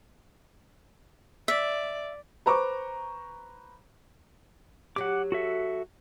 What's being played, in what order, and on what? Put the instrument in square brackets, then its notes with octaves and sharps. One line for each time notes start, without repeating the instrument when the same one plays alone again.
[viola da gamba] D5 [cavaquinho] E5
[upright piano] B4 C5 A#5 C#6 D6
[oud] F#3 G4 [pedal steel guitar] F#5 D6
[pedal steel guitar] F#4 A4 E5